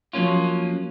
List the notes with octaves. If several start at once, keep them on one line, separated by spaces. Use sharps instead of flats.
F3 F#3 A#3 C#4 F4